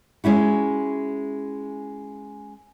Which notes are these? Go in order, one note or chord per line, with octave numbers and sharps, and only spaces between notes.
G#3 C#4 E4 F#4